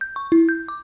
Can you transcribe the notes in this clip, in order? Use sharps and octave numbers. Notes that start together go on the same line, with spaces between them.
G6
C#6
E4
G6
D6